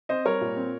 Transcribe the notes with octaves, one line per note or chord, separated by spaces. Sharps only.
C4 C5 D#5
G3 A#4 C#5
A#2
C4